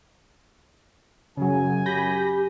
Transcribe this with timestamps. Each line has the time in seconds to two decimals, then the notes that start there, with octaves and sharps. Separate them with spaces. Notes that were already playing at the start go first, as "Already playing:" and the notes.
1.37 F#2 C#3 F#3 G#5
1.86 G4 B5 G6 A#6